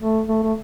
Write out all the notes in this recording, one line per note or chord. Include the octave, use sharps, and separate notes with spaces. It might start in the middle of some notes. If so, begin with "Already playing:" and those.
A3
A3
A3